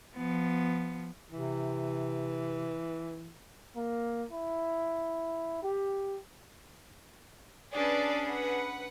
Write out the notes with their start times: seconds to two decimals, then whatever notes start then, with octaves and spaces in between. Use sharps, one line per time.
0.16 F3 B3
1.31 C3 E3
3.76 A#3
4.31 E4
5.62 G4
7.73 C#4 D4 G#4 B4 D5 A5
8.28 B4 F#5